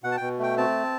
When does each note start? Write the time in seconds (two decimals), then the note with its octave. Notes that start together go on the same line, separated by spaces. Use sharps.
0.03 B2 F#5
0.12 A5
0.17 B2 G5
0.38 A3 G5
0.57 C4 A5